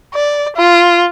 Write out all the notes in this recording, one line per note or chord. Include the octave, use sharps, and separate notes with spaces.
D5
F4